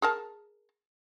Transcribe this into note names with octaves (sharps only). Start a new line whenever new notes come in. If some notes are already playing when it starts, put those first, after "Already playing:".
G#4 A#4 A5